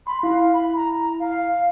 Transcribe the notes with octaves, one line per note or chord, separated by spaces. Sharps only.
B5 C6
E4 F5
B5
A#5
F5